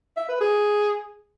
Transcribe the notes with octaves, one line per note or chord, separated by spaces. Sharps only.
E5
B4
G#4